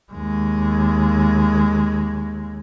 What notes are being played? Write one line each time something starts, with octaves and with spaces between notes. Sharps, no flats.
D#2 G#3